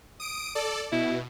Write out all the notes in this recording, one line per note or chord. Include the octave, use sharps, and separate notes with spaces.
D#6 D7
A4 D5
B2 E4